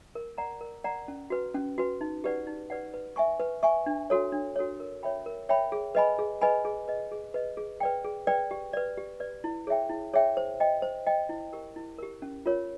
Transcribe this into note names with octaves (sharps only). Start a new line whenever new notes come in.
A#4
D5 F#5 A#5
A#4
D5 F#5 A#5
C#4
F#4 B4
C#4
F#4 B4
D#4
G4 B4 D5 F#5
D#4
G4 B4 D5 F#5
B4
E5 G#5 C#6
B4
E5 G#5 C#6
D4
F#4 A4 C#5
D4
F#4 A4 C#5
A#4
C#5 E5 G5 B5
A#4
C#5 E5 G5 B5
G#4
B4 D#5 G#5 B5
G#4
B4 D#5 G#5 B5
G#4
B4 D#5
G#4
B4 D#5
G#4
B4 D5 G5
G#4
B4 D5 G5
G4
B4 D5
G4
B4 D5
E4
G#4 C#5 E5 G5
E4
G#4 C#5 E5 G5
C5
D#5 G5
C5
D#5 G5
E4
G4 A#4
E4
G4 A#4
C#4
F4 A#4 C#5